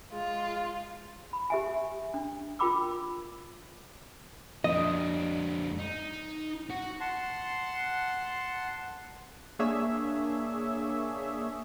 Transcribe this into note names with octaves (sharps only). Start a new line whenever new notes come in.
G#3 F4
B5
G4 E5 G#5
D4
F4 A#4 G5 B5 D6 E6
F2 D4 D#5
D#4
F#4
F#5 A5 C6
A#3 D4 G#4 C#5 E5